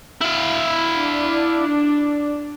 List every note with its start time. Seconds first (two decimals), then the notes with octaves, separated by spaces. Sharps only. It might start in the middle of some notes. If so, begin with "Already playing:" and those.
0.21 E4 F5
0.99 D4